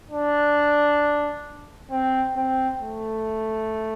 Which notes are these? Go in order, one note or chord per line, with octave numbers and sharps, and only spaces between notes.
D4
C4
C4
A3